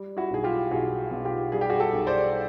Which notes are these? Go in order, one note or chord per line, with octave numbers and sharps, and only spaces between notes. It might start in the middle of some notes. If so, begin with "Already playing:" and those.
Already playing: G3
E4 F#4
B1 G#4
F4 G4
B1 F#4 G#4
B2
F4 G4
G3 G#4
G4
F#4 G#4
G4 A4
B1
C5 D5